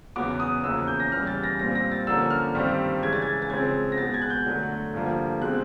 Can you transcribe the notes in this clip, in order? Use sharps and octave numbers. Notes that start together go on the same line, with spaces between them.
E2 C#3 F#3 B3 D6
D#6
E2 C#3 F3 A#3 C#4 E6
G6
A#6
E2 C#3 E3 G3 F6
A6
A#6
A#2 G3 C4 A#6
A#6
A6
D3 F3 A#3 C#4 E6
F6
G2 D#3 G3 C4
C#3 E3 G#3 G#6
A6
G#6
A6
C#3 F3 G#3 C4 G#6
A#6
B2 G#3 B3 A6
G#6
F#6
G6
D3 F#3 A3
G2 D3 F3 A#3
B2 G#3 C4 F#6